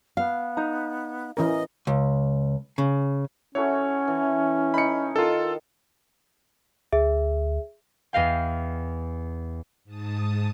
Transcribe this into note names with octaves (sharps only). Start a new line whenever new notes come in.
B3 F5
D#4 A#5
E3 C#4 A#4 D#5
C#2
C#3
C#4 E4 F#4 A4 C#5
E3
D#4 B5 C#7
D#3 F4 A4
D2 G#4 E5
E2 D#5 F5 G5
G#2 A5 D#6